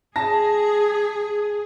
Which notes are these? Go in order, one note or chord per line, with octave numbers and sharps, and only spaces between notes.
G#4 A5 A#6